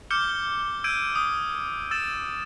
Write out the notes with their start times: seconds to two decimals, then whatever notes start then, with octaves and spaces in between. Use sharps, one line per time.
0.11 D6 F6 G6 C#7 G7
0.84 E6 G6 G#6 D7 D#7
1.15 D#6
1.91 E6 A6 E7